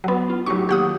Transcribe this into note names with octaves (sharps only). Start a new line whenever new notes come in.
F#3 B3
F4
A2 F#3 D#4 G4 C#6
D#3 F#3 A#3 G4 F#5 D#6